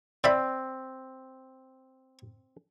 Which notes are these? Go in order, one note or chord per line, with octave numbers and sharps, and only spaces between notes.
C4 D5 E5 B5